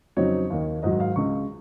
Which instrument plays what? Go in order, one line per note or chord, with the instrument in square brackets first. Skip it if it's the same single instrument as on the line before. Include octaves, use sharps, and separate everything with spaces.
[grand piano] F2 C#3 F#3 C4 D#4 C#5
D#2 D#3 A#3 D#4
G#2 D#3 F#3 D#5
F5
C#2 C#3 G#3 C#6